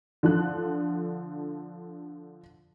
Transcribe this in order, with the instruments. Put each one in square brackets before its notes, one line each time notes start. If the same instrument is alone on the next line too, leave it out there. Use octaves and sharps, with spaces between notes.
[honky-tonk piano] D3 F3 F#6